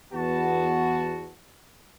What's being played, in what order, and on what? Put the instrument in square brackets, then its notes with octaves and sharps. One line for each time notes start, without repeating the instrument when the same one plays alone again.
[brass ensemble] E2 B3 F#4 A5